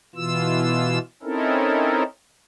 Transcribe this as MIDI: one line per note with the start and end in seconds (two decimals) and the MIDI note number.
0.15 0.99 47
0.15 0.99 52
0.15 0.99 65
0.15 0.99 88
1.23 2.03 60
1.23 2.03 61
1.23 2.03 63
1.23 2.03 64
1.23 2.03 69
1.23 2.03 70